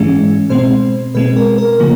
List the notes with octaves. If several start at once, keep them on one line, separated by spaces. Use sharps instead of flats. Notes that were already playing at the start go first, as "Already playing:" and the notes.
Already playing: G#2 E3 G#3 C#4
B2 G#3 C4 C5
B2 G#3 C4 B4
A#4
A#4
C#3 F3 A#3